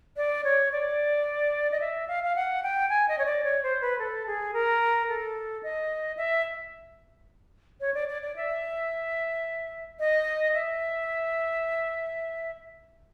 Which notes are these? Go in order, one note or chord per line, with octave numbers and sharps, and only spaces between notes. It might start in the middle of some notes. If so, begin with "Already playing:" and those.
D5
C#5
D5
D#5
E5
F5
F5
F#5
G5
G#5
D#5
C#5
D5
C#5
C5
B4
A4
G#4
A#4
A4
D#5
E5
C#5
D5
D5
D5
E5
D#5
E5